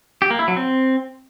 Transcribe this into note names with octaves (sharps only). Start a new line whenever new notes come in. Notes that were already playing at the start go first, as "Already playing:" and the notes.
G4
A#3
E4
F#3
C4